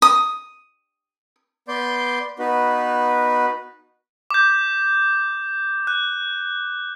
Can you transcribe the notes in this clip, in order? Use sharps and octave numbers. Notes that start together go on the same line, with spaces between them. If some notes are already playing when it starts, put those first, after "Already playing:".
D#6
B3 D5 C6 G6
B3 D#4 F#4 B4
D6 G6
F#6